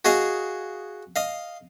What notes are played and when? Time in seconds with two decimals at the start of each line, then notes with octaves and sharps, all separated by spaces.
0.05 F#4 G#4 D#5 F5
1.16 D#5 F5